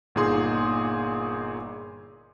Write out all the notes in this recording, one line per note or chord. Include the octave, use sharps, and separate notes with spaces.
G1 A#2 D#4 G#4 C6